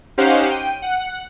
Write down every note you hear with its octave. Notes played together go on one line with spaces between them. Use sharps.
C#4 D#4 G4 C5 F5 F#5
G5 D#7
F#5